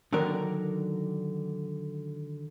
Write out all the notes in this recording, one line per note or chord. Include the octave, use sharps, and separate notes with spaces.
D3 D#3 F#3 D4 A#4